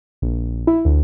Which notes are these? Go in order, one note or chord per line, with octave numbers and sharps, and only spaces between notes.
A#1
E4
D2